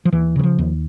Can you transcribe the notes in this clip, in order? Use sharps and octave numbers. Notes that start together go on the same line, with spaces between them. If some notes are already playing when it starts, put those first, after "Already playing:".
F3
D#2 E3
C#3 E3
F3
D#2